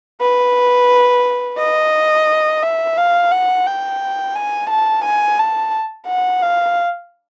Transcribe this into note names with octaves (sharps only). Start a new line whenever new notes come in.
B4
D#5
E5
F5
F#5
G5
G#5
A5
G#5
A5
F#5
F5